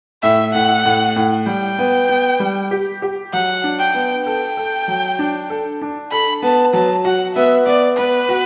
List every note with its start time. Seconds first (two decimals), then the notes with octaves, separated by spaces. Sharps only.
0.22 A2 E5
0.54 A2 F#5
0.85 A2
1.16 A2
1.46 G3 G5
1.79 B3
2.09 B3
2.40 G3
2.71 G4
3.02 G4
3.33 F#3 F#5
3.64 D4
3.79 G5
3.94 B3
4.25 A4 G5
4.57 A4
4.88 F#3
5.19 D4
5.50 A4
5.82 D4
6.12 A4 B5
6.42 B3 A5
6.73 F#3 A5
7.05 F#4 F#5
7.35 B3 E5
7.66 B3 D5
7.97 B3 B4
8.29 F#4